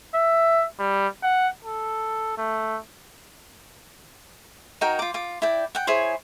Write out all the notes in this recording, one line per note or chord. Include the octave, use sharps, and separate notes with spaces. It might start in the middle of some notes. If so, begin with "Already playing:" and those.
E5
G3
F#5
A4
A3
D#4 F#4 A#4 G5
F4 D6
F4 D6
E4 D5 G5
F#5 G5
E4 G#4 C5 C#5